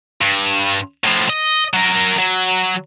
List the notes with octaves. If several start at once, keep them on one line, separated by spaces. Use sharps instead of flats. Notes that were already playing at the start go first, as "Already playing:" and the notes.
G2
A2 F3
D#5
F#3 A#4
F#3